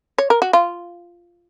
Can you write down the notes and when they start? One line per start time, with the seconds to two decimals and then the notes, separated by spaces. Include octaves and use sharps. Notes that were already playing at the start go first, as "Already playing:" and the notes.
0.18 C#5
0.30 A#4
0.42 F#4
0.53 F4